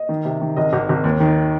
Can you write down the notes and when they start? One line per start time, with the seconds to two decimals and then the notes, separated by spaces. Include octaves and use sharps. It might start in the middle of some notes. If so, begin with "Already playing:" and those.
Already playing: D#5
0.09 D#3
0.25 C3
0.42 D#3
0.56 G#1 D#5
0.73 G#1
0.89 G#1
1.04 D#2
1.20 D#3